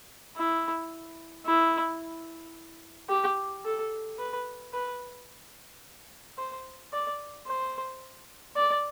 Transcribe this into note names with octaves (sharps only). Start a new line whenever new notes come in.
E4
E4
G4
A4
B4
B4
C5
D5
C5
D5